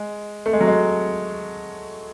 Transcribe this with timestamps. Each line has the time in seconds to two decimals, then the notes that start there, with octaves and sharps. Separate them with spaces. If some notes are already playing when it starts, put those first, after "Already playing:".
Already playing: G#3
0.46 A3
0.53 G#3
0.61 F#3
0.67 G#3